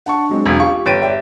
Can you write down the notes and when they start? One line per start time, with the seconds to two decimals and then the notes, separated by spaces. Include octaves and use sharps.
0.06 D4 F#5 A5 C#6
0.29 F#3 G#3 C4
0.46 E1 B1 G#6
0.60 F4 G4 F5 C#6
0.86 G1 B4 C#5 G5 A6 D7 D#7
1.02 G4 D5 E5 G5